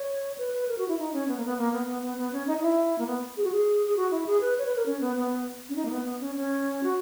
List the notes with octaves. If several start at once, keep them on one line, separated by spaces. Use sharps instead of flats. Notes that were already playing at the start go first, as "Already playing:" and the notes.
Already playing: C#5
B4
B4
A#4
F#4
E4
D#4
C#4
B3
A#3
B3
A#3
B3
B3
B3
B3
C#4
D#4
D#4
E4
A#3
B3
G#4
F#4
G#4
G#4
F#4
E4
G#4
B4
C#5
B4
A#4
C#4
B3
B3
C#4
D#4
A#3
B3
B3
C#4
C#4
F#4